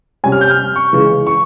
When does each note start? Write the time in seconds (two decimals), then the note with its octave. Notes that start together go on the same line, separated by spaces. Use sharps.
0.24 C3 G3 C#4 G#5
0.32 F6
0.41 G6
0.50 F6
0.76 C#6
0.93 C#3 E3 G#3
1.27 C#6